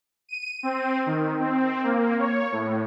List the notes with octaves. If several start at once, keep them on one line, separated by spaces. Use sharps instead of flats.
D#7
C4
D#3
C4
A#3
C#5
A2